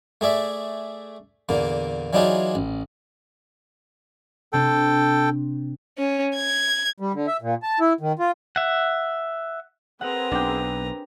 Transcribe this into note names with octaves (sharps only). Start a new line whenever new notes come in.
A3 G#4 D5 E5
E2 A#2 D3 A#3
E3 F#3 D4 D#4 F4 G#4
A1
C3 C4 D4 A4 G5
C#4
G#6
G3
D3
E5
A#2
A5
E4
D#3
F4
E5 F#5
C4 G#4 A#4 B4 F#5 A#5
B1 D4 G5